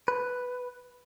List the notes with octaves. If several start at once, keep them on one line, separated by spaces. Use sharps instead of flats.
B4